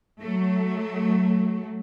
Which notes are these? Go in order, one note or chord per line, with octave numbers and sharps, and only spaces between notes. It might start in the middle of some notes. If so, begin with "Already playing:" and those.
F#3 A3